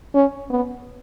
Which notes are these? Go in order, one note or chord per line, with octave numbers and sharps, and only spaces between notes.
C#4
B3